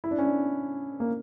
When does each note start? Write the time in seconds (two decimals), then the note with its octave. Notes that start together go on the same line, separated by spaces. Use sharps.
0.04 E4
0.11 D4
0.18 C#4
0.25 D4
1.00 A#3